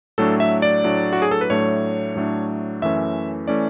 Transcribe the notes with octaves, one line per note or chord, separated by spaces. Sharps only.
A2 F#3 A3 D4 A4
E5
D5
A2 F#3 A3 D4
F#4
G#4
A4
B4
A2 F#3 A3 D4 C#5
A2 F#3 A3 D4
F#2 E3 A3 C#4 E5
E3 A3 C#4 D5